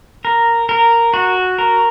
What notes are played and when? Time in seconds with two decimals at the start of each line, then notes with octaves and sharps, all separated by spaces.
0.25 A#4
0.69 A#4
1.14 F#4
1.58 A#4